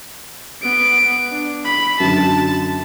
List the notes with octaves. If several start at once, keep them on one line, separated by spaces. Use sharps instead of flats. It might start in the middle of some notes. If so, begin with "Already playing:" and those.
B3 D7
D4
B5
F#2 D3 A5